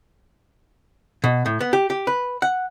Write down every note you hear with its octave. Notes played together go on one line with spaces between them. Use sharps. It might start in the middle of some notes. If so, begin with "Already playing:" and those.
B2
A2
B3
G4
G4
B4
F#5